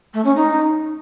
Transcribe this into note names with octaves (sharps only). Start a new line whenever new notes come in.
A3
C#4
D#4